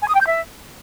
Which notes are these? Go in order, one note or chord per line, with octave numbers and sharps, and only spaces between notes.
G#5
D#6
G5
G6
E5